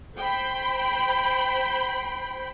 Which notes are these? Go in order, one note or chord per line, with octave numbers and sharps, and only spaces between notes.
C5 G5 B5